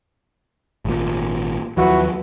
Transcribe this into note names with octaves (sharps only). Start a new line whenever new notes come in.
G#1 A#2
D#2 F3 F#3 E4 F#4 B4